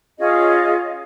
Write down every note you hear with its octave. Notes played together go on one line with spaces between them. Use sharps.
C#4 F4 G#4 D#5